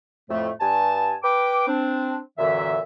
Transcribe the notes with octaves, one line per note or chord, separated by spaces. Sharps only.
F2 A2 A3
G2 G#5 A5
B4 G5 D6
C4 D4
F#2 A#2 D3 E3 E5